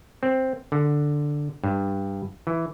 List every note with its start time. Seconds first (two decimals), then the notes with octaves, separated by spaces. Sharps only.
0.23 C4
0.72 D3
1.64 G2
2.47 E3